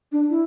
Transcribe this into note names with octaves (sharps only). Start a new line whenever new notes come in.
D4
E4